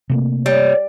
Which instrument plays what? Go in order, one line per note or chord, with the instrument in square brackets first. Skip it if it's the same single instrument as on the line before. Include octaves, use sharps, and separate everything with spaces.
[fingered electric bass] C3 A3 A#3
[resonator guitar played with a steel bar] G3 [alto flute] C#5